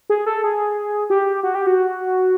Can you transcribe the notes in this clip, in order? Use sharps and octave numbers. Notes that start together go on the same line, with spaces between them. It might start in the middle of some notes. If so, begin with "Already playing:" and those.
G#4
A4
G#4
G4
F#4
G4
F#4